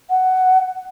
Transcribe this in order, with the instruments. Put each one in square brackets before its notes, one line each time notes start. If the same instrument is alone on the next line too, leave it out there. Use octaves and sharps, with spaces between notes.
[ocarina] F#5